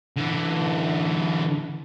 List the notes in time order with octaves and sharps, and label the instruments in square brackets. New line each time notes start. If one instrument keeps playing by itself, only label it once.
[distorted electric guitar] D3 E3